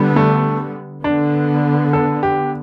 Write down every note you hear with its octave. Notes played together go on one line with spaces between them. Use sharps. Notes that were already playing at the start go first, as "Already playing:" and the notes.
Already playing: D3 G3 B3
A3
D3 B3 D4
A4
G4